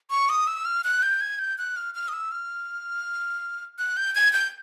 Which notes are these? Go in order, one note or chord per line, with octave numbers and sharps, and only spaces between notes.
C#6
D#6
E6
F6
F#6
G6
G#6
G6
F#6
F6
F6
D#6
E6
F6
F#6
G6
G#6
G6